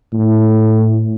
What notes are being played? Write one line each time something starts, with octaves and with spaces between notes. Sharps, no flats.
A2